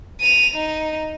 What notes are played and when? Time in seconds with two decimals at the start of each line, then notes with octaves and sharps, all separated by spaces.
0.21 D#7 F7
0.54 D#4